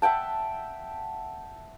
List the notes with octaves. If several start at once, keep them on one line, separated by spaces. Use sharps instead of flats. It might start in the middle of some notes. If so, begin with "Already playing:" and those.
E5 F#5 G5 A5